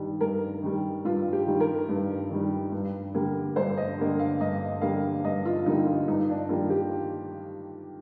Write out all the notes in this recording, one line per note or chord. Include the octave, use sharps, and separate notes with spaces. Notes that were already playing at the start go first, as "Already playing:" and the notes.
Already playing: G2 D#3 G3
G2 A#4
D#3 G3
G2 F4
G4
D#3 G3
A#4
G2
D#3 G3
G2
D3 G3 A#3
G2 C5
D#5
D3 G3 A#3
F5
G2 D#5
D3 G3 A#3 F5
G2 D#5
F4
D3 G3 A#3 D#4
F4
G2 D#4
D4
D#3 G3 A#3 F4
G4